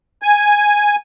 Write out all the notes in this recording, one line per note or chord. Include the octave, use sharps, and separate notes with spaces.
G#5